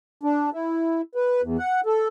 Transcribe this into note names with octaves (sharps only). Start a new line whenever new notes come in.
D4
E4
B4
E2
F#5
A4